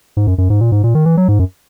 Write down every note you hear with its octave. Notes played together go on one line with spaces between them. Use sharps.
G#2
F#2
F#2
G#2
A#2
G#2
A#2
D#3
E3
F#3
G#2
F#2